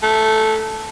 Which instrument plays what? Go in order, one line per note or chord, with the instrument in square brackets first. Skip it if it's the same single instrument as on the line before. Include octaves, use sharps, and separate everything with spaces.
[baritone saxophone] A3